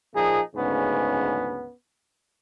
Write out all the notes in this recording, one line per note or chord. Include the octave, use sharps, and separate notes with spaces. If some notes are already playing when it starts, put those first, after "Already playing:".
A#2 F3 A#3 D#4 G#4
D2 G#2 C#3 B3 C#4